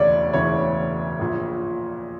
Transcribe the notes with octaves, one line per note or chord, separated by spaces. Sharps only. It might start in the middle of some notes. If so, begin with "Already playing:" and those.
Already playing: E1 D2 C#3 E3 C#5 D5
E1 D2 C#3 E3 C#5
A#1 A#2